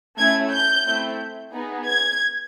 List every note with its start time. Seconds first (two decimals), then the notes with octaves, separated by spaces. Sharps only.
0.19 A3 C#4 E4 G#6
0.53 G6
0.86 A3 C4 E4
1.54 B3 D#4 G#4
1.88 G#6